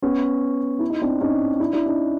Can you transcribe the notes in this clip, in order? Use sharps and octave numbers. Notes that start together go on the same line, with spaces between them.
B3 C#4
E4
D#4
C4 D4
C#4 D#4
D4 E4
D4 E4
C#4 D#4